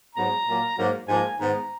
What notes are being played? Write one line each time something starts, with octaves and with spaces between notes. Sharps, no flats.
G#2 F#3 B3 A#5
A#2 F#3 A#3
G#2 F#3 A#3
G#2 F3 A#3 G#5
G#2 D#3 G#3 B3 A#5